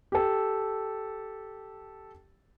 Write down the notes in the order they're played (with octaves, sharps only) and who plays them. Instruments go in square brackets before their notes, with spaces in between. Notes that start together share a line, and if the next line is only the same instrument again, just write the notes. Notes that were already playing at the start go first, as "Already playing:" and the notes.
[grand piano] G4 A4